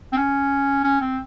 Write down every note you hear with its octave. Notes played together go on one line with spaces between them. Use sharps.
C4
C#4
C#4
C4